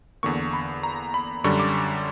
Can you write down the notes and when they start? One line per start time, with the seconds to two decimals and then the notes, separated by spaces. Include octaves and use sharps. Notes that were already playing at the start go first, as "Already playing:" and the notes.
0.23 E2 D3 A#3 C#6
0.53 B5
0.83 A#5
1.14 B5
1.44 F#2 D3 G3 C#6
1.59 D6